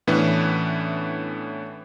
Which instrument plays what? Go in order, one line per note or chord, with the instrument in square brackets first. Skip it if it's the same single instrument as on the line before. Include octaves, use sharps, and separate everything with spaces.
[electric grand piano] A2 E3 B3 C#4 D4 B4